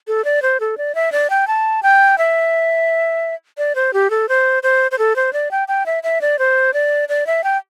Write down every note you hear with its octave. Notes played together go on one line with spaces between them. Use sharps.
A4
D5
C5
A4
D5
E5
D5
G5
A5
G5
E5
D5
C5
G4
A4
C5
C5
C5
A4
C5
D5
G5
G5
E5
E5
D5
C5
D5
D5
E5
G5